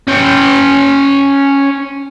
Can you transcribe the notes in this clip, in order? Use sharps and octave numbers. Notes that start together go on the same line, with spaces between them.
C#4 G5